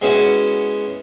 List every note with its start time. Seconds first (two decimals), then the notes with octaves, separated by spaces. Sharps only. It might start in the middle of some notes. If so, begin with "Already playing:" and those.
0.02 G#3 B3 C#4 E4 F#4